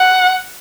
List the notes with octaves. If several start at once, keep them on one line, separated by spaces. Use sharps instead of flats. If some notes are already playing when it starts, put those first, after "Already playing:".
Already playing: F#5